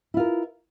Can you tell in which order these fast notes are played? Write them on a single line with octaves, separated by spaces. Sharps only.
E4 F4 A#4